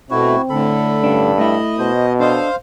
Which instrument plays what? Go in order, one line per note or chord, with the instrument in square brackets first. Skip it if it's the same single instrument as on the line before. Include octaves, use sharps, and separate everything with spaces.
[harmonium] B2 A3 [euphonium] C4 [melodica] E4 F#4
[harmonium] A2 D3 [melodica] A4 B5
[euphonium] G2 [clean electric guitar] C#4 D4
[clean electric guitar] A3 E4 [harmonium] D#5
[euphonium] B2 [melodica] C5
[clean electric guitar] D4 D#5 [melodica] A4 [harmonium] C5 F5